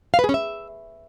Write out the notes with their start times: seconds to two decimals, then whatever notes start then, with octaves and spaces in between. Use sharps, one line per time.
0.14 F5
0.19 B4
0.24 G#4
0.29 C#4
0.34 E5